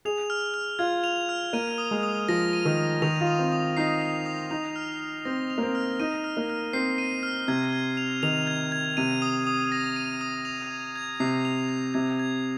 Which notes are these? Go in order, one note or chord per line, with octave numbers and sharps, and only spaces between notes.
G#4 F7
F6
F6
F4 G#6
F7
F6
A#3 D#7
D#6
G#3
D#6
F3 A#6
D#7
D#3
D#6
D#3 F7
F4
D#6
C4
D#6
D#4 C7
F7
D#6
D#4 F7
F6
F6
C4 A#6
F7
A#3
C4
F6
D#4 D#7
F6
A#3
F6
C4 C7
D#7
F6
C3 G#6
G#6
F7
D#3 F7
G#6
G#6
C3 D#7
D#6
D#6
A#6
D#7
D#6
F7
G#6
G#6
C3 C7
F7
G#6
C3 G#6
G#6